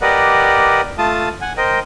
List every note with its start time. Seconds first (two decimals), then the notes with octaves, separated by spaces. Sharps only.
0.01 G4 A#4 B4 D5 D#5 F#5
0.98 A3 F4 A5 D#6
1.41 F#5 G#5
1.57 A#4 C5 D#5 G5